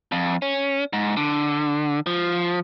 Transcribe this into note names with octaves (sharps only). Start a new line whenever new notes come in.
F2
C#4
G#2
D3
F3